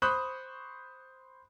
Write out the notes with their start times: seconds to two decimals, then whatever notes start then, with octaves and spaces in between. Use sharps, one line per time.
0.02 C5 B5 C#6 D#6 F#6 G6